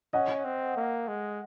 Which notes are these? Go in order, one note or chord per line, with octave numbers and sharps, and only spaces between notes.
C#4 D#5 F#5
C4
A#3
G#3